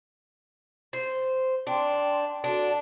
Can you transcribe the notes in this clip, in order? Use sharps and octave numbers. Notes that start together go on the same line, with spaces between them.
C5
D4 G5 C6
D4 F#4 A4 A5